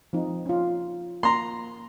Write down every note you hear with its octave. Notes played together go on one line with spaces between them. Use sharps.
F3 C4 D#4
C#4 F4
A#3 A#5 C6